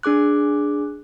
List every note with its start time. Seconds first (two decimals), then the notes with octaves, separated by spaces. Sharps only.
0.03 D4 G#4 D6 F#6